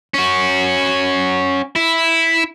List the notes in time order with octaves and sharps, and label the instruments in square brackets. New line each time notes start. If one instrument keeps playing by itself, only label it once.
[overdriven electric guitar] C#4 F#4
E4